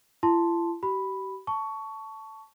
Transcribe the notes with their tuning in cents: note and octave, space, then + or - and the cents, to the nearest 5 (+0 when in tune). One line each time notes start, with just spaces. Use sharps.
E4 +45 A5 +0 C6 +0
G4 -40 B5 +0
A5 +0 C#6 +15